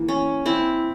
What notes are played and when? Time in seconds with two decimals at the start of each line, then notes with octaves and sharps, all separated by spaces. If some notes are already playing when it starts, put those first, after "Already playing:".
Already playing: E3 A#3
0.09 C#4
0.46 C4 E4